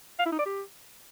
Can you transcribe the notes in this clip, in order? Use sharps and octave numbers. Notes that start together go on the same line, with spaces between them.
F5
E4
D#4
D5
G4